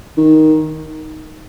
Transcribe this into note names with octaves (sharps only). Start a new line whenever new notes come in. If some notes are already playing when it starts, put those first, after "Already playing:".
D#3